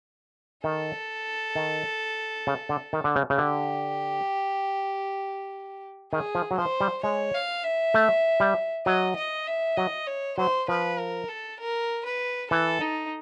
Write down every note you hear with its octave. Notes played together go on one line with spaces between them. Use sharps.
D#3 A4
D#3
C#3
D3
D#3
D3
C#3
C#3
D3 G4
D#3 G#4
F3
F#3
F3 C5
G3
G#3 C#5
F5
E5
A3
G3
F#3 D#5
D#5
E5
F#3 D#5
C#5
F#3 C5
F3 B4
A#4
A4
A#4
B4
E3 A4
D#4